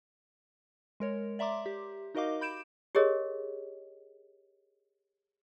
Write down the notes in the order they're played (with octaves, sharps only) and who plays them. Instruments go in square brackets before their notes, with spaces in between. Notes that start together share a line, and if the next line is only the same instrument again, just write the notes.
[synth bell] G#3 A#4 C#5
D5 E5 A#5 C6 D6
G4
D#4 F#4 A#4 D#5 F5 D6
B5 G6 D7 E7
[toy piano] G4 G#4 A#4 C#5 D#5